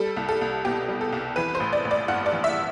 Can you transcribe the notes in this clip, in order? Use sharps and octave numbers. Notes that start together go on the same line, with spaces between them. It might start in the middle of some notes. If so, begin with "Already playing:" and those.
Already playing: G3 A4
C2
A4
C2
B2 G4
G3
A4
C2
E3 B4
C5
A1
D5
A1
D5
G2 F#5
D5
E3
E5